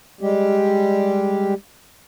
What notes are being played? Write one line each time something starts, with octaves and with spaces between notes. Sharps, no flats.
G3 G#3 G4